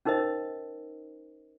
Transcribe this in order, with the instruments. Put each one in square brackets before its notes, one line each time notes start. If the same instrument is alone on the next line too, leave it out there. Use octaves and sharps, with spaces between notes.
[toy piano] C#4 D#4 A#4 C5 D#5